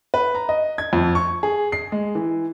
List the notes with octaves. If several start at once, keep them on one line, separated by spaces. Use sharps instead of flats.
B4
A#5
D#5
G#6
F2
C#6
G#4
C7
G#3
E3